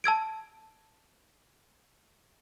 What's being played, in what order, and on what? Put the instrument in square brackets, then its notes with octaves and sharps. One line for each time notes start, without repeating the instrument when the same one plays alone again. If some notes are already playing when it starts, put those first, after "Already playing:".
[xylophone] A5 E6 G#6 D7